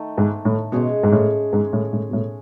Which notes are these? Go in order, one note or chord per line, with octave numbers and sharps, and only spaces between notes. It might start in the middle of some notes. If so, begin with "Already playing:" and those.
Already playing: D#3 A3 D#4
G#2
A2
B2 G#3 C#4 G#4 C#5
G#2
A2
G#2
A2
A2
B2
A2